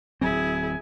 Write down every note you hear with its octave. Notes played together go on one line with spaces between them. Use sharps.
D1 F#3 C4 E4 G#4 G#5